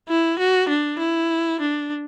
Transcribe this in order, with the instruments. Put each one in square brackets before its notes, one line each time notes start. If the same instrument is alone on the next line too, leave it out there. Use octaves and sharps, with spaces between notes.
[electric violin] E4
F#4
D4
E4
D4